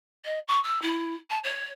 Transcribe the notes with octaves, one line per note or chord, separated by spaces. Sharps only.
D#5
C#6
E6
E4
A5
C#5